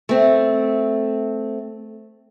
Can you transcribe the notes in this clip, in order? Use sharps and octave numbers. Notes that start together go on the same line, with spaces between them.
A3 C4